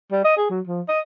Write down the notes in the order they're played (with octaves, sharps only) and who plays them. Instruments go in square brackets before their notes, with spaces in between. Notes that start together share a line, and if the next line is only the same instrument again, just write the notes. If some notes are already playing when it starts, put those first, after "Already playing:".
[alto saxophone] G3
D#5
G#4
F#3
F3
D#5